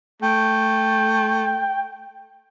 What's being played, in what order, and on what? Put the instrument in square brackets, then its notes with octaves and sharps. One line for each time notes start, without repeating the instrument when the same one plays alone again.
[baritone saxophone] A3 [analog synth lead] G5